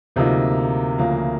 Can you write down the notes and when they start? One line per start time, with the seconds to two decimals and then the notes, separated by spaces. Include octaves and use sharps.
0.16 D2 C3 F3 A#3 D#4
0.99 D2 C#3 F3 A#3